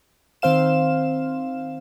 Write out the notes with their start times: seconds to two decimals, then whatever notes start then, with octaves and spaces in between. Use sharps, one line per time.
0.42 D#3 C4 C5 F5 E7